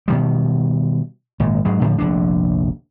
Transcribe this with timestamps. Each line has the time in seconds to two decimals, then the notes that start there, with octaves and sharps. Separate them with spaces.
0.08 B2 D#3 G3
1.40 G#1 A#2
1.65 G#2 F#3 G#3
1.82 A2 D3 F3
1.98 F1 A#1 D3 D4